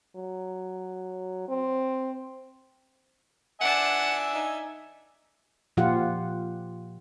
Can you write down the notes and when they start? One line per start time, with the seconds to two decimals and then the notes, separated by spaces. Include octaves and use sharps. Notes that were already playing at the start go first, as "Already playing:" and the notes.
0.16 F#3
1.48 C4
3.61 D4 E5 F#5 G#5 A5
4.34 D#4
5.77 A#2 F3 F4 G4 F#5